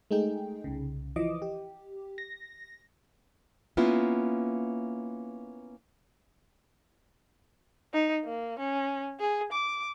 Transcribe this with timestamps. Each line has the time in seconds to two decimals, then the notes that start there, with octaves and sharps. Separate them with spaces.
0.11 G#3 A3 D#4 G#4 G5
0.64 C2 C#3
1.16 E3 F3 D#5 D6
1.42 G4
2.18 A#6
3.77 A#3 B3 C#4 E4 F4
7.93 D#4
8.24 A#3
8.59 C#4
9.20 G#4
9.52 D6